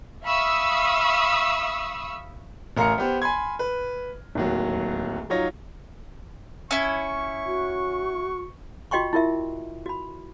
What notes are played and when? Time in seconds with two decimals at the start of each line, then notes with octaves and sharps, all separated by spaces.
0.24 E5 F5 B5 C#6 D#6 E6
2.77 A1 A#4 F5 A#5 F6 C#7
2.98 B3 G4 C5
3.22 G#5 B5 C6 G#6
3.59 B4
4.35 D1 D#2 F#3
5.30 F#3 D#4 F4 C#5 A#6
6.71 C#4 E4 C#6
7.46 F#4
8.91 F4 F#4 D#5 G5 C6 C#6
9.13 E4 F4 A#4 E5
9.86 F#4 B5